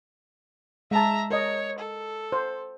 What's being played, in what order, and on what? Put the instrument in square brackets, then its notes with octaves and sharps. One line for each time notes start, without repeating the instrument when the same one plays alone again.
[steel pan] G#3 A5 [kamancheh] E5 A#5
[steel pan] A#4 D#5 [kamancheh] C#5
[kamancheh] A4
[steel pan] C5